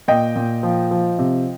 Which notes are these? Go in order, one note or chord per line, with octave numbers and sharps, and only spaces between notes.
A#2 D#5 G5
A#2
F3
F3
C3